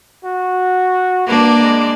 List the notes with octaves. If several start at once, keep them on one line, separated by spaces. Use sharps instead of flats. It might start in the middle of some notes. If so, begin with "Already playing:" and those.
F#4
A#3 D4 B4
G#3